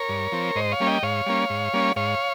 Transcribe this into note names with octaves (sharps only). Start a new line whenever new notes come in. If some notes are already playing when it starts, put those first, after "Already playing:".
Already playing: A#4 C#5
G2
F3 C4
G#2 C5 D#5
C#5 F5
G3 A#3 C#4
D#5 G5
G#2 C#5 F5
G3 A#3 C#4
G#2
G3 A#3 C#4
G#2 C#5 F5